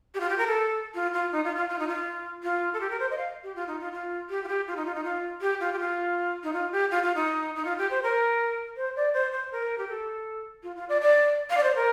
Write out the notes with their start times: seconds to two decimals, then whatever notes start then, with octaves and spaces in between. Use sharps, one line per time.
0.14 G4
0.20 F4
0.30 G4
0.38 A#4
0.47 A4
0.94 F4
1.14 F4
1.32 D#4
1.45 F4
1.56 F4
1.69 F4
1.79 D#4
1.88 F4
2.44 F4
2.74 A4
2.81 G4
2.91 A#4
3.00 C5
3.11 D#5
3.18 F5
3.43 G4
3.56 F4
3.68 D#4
3.80 F4
3.93 F4
4.29 G4
4.44 F4
4.48 G4
4.67 F4
4.77 D#4
4.86 F4
4.95 D#4
5.04 F4
5.41 G4
5.60 F4
5.73 G4
5.79 F4
6.44 D#4
6.53 F4
6.72 G4
6.91 F4
7.03 F4
7.15 D#4
7.56 D#4
7.65 F4
7.78 G4
7.91 C5
8.03 A#4
8.77 C5
8.96 D5
9.14 C5
9.32 C5
9.52 A#4
9.78 G4
9.89 A4
10.63 F4
10.76 F4
10.89 D5
11.01 D5
11.50 F5
11.57 D5
11.63 C5
11.76 A#4